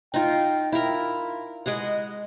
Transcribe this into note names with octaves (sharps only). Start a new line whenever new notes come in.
D#4 F4 G5
E4 F4 A#4
G#3 G#4 D#5 F#5